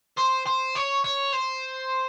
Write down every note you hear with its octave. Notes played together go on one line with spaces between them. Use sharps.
C5
C5
C#5
C#5
C5